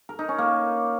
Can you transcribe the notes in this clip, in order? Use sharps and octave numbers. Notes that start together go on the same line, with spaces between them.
A#4
D#4
C#4
A#3